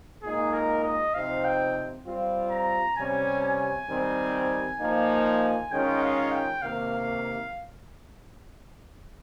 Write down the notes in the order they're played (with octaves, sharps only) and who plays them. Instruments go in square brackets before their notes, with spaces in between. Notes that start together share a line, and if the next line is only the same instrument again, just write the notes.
[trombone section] A#2 G#3 D#4 [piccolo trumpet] G#4
[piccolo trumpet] A#4
D#5
[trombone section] C3 F3 C4 D#4 [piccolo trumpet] F5
[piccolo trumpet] G5
[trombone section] G3 C4 F4
[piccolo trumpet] A#5
[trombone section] C3 G3 C#4 [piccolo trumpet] G#5
[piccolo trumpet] G#5
[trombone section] D#3 G3 C4
A#2 F3 A#3 D#4
[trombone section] D#3 G#3 C#4 F4 [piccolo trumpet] G5
[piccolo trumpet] F5
G5
[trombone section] C3 D#3 A#3 [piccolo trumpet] F5